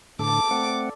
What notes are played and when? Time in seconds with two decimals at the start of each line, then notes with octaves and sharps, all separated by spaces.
0.19 A2 D3 A4 D6
0.51 A3 C4 D5 F#5